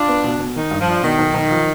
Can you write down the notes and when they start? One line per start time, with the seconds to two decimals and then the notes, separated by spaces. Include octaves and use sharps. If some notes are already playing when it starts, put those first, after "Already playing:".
Already playing: D4 F4
0.08 B3
0.24 B2
0.40 B2
0.56 D#3 D#4
0.71 G2
0.80 F3
0.87 D4
1.03 B2 D#3
1.18 B1
1.34 B1
1.51 F3